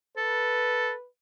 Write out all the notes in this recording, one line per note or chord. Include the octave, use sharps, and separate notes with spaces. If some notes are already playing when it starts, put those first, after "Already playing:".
A4 B4